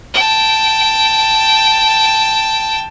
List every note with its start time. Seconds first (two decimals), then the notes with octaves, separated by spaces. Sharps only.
0.14 G5 A5